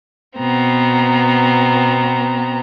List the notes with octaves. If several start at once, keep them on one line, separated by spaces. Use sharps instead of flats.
B2 B3 C4 A#5